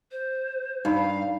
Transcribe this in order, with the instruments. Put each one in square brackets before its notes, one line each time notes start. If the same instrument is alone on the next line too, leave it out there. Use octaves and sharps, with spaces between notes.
[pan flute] C5
[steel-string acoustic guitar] G2 [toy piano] D#4 A#5 B5 [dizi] F5